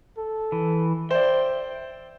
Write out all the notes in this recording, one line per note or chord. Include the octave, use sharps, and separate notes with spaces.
A4
E3
C5 D5 E5 G5